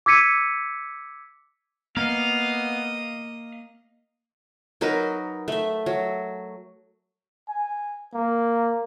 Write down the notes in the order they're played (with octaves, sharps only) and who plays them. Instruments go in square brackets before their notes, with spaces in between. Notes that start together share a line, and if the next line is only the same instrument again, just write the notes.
[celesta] D6 E6 G#6 B6 C#7 D#7
[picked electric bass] A#3 [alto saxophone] B3 [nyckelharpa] D#5 [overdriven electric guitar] F5
[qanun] F#3 D#4 A#4 B4
A3 E5
F#3
[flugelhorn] G#5
A#3